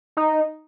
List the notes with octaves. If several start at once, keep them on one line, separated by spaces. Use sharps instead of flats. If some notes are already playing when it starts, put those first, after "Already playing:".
D#4